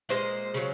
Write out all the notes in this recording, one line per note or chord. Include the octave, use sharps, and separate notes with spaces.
A#2 F3 G#3 C5 D#5
C#3 F#3